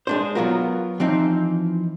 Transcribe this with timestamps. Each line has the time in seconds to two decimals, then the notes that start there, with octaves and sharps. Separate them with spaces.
0.07 G#3 D4 C5
0.35 F#3 B3 F4 F#4 A#4
1.00 E3 F3 C4 D#4